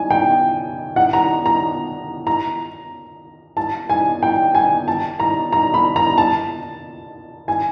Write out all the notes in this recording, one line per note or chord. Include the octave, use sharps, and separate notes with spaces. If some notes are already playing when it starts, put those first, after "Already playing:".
Already playing: G#5
G5
F#5
A#5
A#5
A#5
A5
G#5
G5
G#5
A5
A#5
A#5
B5
A#5
A5
G#5